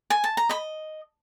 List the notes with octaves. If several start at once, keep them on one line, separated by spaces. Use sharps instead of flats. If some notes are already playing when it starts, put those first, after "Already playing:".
G#5
A5
A#5
D#5 B5